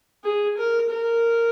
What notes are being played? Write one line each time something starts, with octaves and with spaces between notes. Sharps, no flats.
G#4
A#4
A#4